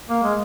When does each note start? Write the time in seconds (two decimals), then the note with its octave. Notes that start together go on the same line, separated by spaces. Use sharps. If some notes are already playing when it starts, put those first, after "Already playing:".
0.09 A#3
0.23 G#3